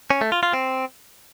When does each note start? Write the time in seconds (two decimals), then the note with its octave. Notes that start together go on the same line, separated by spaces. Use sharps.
0.10 C#4
0.21 A3
0.32 F4
0.43 F4
0.53 C4